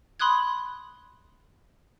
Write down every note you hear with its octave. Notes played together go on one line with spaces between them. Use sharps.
B5 C6 D#6 F#6 G#6